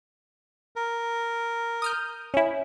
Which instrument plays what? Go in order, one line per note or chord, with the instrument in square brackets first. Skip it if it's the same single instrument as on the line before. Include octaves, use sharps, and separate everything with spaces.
[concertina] A#4
[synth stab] D#6 F6 G6
C#4 E4